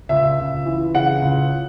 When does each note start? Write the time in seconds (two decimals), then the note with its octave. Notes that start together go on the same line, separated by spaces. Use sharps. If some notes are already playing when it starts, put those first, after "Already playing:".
0.09 C#2 E5
0.38 C#2
0.66 E3
0.94 C#3 F#5
1.22 C#2